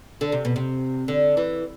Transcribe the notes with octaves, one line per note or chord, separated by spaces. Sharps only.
D3
C3
B2
C3
D3
E3